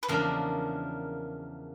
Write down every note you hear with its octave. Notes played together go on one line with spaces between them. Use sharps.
B4
E2 C#3 F3 A#3 D4 A#4